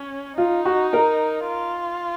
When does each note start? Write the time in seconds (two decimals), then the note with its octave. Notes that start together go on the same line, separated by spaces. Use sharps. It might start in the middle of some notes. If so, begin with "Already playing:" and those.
Already playing: C#4
0.38 D#4 F4
0.65 F#4
0.93 A#4
1.47 F4